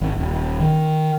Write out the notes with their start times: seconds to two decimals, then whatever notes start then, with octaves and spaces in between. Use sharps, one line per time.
0.01 G#1
0.19 D#1
0.60 D#3